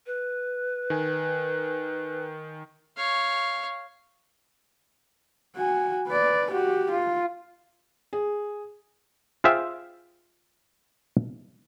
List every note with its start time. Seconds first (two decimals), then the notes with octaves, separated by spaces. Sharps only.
0.06 B4
0.90 D#3 G#5
2.97 C#5 F5
5.56 F#4 G#5
6.07 B4 D5
6.51 F#4 G4
6.91 F4
8.13 G#4
9.44 F4 G#4 C5 E5 F5 G5